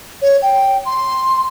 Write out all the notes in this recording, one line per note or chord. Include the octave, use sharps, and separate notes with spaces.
C#5
G5
C6